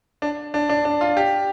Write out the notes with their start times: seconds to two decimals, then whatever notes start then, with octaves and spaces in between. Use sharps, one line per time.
0.22 D4
0.54 D4
0.69 D4
0.85 D4
1.01 F4
1.17 G4